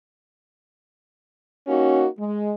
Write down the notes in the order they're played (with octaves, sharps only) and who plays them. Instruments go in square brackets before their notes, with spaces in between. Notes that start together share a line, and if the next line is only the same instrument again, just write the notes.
[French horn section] A#3 C#4 D#4 F#4
G#3